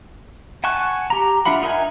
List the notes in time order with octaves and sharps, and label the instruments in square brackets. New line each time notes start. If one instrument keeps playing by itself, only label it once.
[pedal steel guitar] F#5 G#5 A5 C#6 F#6
G4 A#5
D4 F4 E5 F#5 B5
D#4 A#4 E5 F#5 G#5